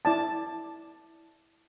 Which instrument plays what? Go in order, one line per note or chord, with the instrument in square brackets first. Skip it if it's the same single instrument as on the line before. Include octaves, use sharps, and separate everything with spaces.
[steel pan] E4 D5 A5